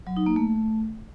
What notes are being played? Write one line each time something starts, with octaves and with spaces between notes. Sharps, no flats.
F#3
D#4
A#3
A3